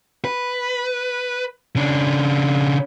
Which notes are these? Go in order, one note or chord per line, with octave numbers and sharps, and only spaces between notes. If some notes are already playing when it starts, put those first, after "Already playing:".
B4
C#3 D4